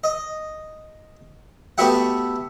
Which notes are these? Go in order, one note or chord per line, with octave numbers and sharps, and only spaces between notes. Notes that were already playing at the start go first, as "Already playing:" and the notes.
D#5
A3 B3 F#4 G4 E5 F#5